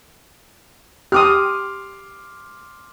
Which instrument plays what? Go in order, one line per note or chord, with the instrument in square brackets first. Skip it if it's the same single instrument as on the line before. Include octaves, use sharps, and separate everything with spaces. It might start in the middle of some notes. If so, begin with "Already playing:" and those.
[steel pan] G4 D#6 [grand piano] C6 D6 F6